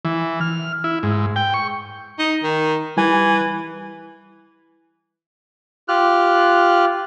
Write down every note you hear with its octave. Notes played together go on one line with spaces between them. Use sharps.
E3
F6
E4
G#2
G5
C#6
D#4
D#3
E3 G3 G#5
F4 G4 F6 F#6